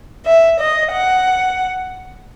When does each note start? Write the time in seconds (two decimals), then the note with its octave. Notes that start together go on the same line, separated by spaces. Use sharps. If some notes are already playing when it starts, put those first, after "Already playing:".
0.25 E5
0.59 D#5
0.92 F#5